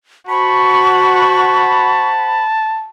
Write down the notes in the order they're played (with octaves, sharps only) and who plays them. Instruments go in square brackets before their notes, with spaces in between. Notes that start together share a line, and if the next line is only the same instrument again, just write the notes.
[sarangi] F#4 [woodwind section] C5 F#5 B5 [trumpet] A5 [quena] C#6